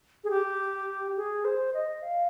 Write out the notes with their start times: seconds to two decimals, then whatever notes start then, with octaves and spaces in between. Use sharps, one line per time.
0.24 G#4
0.30 G4
1.17 G#4
1.45 C5
1.74 D#5
2.02 F5